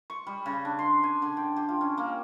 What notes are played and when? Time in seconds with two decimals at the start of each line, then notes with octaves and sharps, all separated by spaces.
0.10 C#6
0.27 G3
0.46 C#3
0.65 D4
0.79 C6
1.03 G#5
1.22 D3
1.37 G5
1.56 G4
1.69 F4
1.81 C#4
1.98 A#3